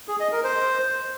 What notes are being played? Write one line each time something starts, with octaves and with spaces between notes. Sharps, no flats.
G#4
D#5
A#4
C5